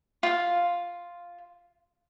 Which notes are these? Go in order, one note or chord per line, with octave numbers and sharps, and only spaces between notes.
F4 F5